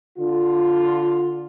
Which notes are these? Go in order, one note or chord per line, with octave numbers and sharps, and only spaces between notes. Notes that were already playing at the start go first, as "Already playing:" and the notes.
D3 F4